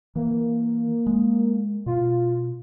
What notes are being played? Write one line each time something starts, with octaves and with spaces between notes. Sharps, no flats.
E3 A#3
G#3
B2 F4